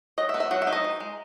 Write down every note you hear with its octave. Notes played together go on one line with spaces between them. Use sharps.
F#3 D#5
E5
B3
E5
F#3 F#5
E5
D#4
D#5
E3
G#3